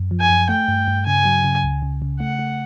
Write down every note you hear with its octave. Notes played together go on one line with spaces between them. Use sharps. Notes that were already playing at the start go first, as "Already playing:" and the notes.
Already playing: F#2
F3
G#5
F#2
A3 G5
G2
G2
C#3 G#5
F#3
C#3
C#2
C#3
C#3
A3 F#5
A3